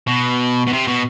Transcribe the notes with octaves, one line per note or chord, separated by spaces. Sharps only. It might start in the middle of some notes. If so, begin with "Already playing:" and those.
B2
B2
C3
B2